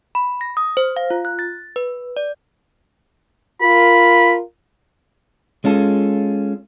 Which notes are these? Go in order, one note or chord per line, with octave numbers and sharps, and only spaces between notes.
B5
A#6
D#6
C5
F5
F4
F#6
A6
B4
D5
F4 A#4 B5
G#3 C#4 F4 A4